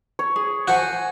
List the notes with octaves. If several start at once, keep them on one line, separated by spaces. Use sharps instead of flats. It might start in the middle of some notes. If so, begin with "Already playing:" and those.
C#5
G#4
F#4 C5 F#5 G#5